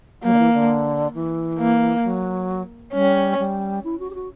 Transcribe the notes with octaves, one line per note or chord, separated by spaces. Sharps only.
F#3 A#3
D3
E3
D3
E3
A#3
F#3
G3 C#4
G3
E4
F#4
G4
F#4